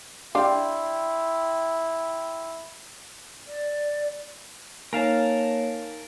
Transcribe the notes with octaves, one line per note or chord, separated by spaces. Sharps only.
G3 D4 E4 F5 G5 C6
D5
A#3 D#4 A#4 C#5 F5 G#5 A5